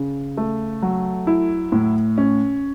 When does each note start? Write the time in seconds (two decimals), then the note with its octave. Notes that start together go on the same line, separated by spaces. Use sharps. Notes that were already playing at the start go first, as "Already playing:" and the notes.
Already playing: C#3
0.37 A3
0.82 F#3
1.27 E4
1.72 A2
2.18 C#4